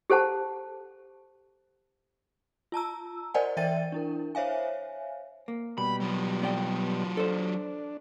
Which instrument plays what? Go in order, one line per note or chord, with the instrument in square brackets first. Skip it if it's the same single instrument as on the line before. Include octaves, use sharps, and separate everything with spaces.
[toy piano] G4 A4 C5 F#5 A5
[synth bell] F4 A5 A#5 E6
A#4 C5 D5 D#5 F#5 G#5
E3 D5 E5 G5 A6 D#7
D4 E4 A#4
C5 C#5 E5 F5 G#5
[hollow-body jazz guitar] A#3
[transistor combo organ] B2 G3 [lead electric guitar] B5
[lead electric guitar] F#3 F4
[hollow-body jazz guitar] B3 D5 G5
[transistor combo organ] D4 [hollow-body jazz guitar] A4 C5